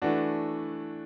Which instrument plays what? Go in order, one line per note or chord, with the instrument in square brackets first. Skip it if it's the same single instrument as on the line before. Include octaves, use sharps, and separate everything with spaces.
[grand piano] E3 A3 D4 F#4